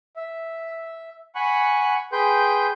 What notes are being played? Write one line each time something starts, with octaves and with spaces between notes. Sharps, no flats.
E5
F#5 G#5 B5 C#6 F#6
G#4 B4 G5 C6 G6